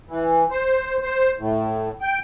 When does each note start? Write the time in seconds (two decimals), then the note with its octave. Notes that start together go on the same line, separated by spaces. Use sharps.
0.09 E3
0.51 C5
1.02 C5
1.38 A2
2.01 G5